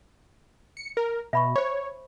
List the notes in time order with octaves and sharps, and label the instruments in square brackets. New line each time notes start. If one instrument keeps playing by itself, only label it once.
[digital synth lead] C#7
A#4
[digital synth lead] B2 [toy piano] E5 B5 C#6
[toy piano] C5 C#6 [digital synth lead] C#5